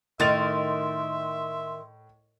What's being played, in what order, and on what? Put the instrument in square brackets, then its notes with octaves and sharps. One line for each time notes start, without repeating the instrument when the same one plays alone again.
[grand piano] A2 A6 F7 [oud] D#3 [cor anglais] E5 [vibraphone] C6